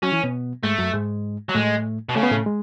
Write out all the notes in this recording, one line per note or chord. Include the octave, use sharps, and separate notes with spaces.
F#3 C#4 F#4
E3 E4
B2 B3
G#2 G#3 A3
F#2 F#3
G#2 G#3
F#3
A2 G#3 A3
B2
C#3 A3
B3
A2 A3
G#3